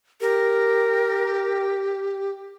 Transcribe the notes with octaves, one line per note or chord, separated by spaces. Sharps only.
G4 A#4